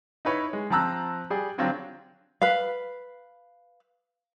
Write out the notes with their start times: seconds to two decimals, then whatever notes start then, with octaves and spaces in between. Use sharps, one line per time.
0.25 D#4 E4 B4 C#5
0.53 G#3
0.70 F3 C4 A5 A#5 E6 F#6
1.30 G3 G#4 D5
1.58 D3 F#3 C4 D4 F4
2.41 B4 F5